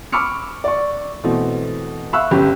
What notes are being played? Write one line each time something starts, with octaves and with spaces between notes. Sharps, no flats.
B5 C#6 D6 E6 F6 C#7
D5 C#6
B2 E3 A3 C4
E5 F5 B5 C#6 E6 F#6
G1 C#4 G4 B5